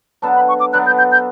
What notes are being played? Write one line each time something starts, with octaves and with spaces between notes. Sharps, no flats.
F#3 B3 D4 A4 A5
B5
C#6
D6
F#3 B3 D4 A4 F#6
G6
G6
G6